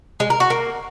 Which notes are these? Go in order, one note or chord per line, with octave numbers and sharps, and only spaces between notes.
G#3
A#4
F#4
A#3